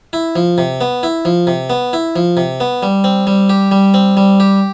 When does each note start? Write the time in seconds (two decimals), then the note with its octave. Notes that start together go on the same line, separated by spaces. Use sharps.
0.13 E4
0.36 F3
0.58 C3
0.81 B3
1.03 E4
1.25 F3
1.47 C3
1.70 B3
1.93 E4
2.16 F3
2.37 C3
2.60 B3
2.83 G3
3.04 C4
3.27 G3
3.49 G4
3.71 G3
3.94 C4
4.17 G3
4.40 G4